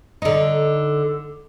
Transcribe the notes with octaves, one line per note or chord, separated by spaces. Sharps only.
D3 D#4